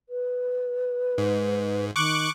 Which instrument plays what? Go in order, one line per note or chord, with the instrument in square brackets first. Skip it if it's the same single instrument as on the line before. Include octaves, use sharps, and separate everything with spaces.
[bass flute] B4
[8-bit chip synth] G#2
[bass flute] D#3 [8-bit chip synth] C#6 D6 F#6